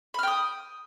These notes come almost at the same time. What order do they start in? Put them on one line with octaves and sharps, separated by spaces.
B5 F6 G5 D#6